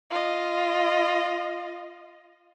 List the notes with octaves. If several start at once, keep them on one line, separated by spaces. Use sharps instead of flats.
F4 D#5